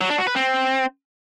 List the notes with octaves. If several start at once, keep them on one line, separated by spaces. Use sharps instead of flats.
F#3
D4
F#4
B4
C4